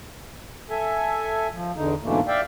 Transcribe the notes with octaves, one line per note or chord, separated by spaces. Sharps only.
A4 E5 G#5
F3
E2 D3 D#4
G#2 B2 D3 E3 A3 A#3
D5 E5 F5 G5